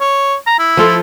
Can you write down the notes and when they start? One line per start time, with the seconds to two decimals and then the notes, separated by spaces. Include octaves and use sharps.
0.01 C#5
0.47 A#5
0.59 E4
0.77 F3 F4 A4